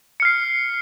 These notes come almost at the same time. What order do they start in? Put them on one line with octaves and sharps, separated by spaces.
C#7 F6 C7